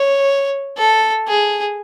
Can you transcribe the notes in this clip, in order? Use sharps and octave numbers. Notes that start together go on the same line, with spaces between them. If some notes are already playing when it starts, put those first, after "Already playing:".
Already playing: C#5
A4
G#4